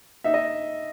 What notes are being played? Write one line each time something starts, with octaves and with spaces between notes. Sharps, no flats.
D#4 E5
D#5